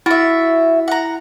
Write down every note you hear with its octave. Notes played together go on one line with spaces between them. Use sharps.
E4 F#4 E5
F#5 A#5